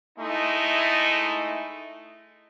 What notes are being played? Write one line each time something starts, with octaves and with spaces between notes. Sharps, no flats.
G#3 A3 D#4 E4